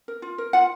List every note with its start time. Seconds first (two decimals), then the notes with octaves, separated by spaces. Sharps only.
0.08 A#4
0.22 F4
0.38 A#4
0.53 F4 F#5